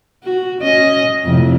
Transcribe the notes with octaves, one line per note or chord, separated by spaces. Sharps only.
F#4
C#4 D#5
F2 A2 C3